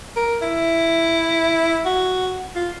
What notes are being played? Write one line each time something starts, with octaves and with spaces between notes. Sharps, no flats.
A#4
E4
F#4
F4